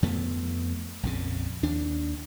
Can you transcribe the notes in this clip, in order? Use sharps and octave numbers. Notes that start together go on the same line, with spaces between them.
F2 F3 A3 B3
A#1 F2 C#3
D#2 D4